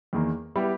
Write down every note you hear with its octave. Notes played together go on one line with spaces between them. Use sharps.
E2 D#3 A#3
G3 B3 E4 G4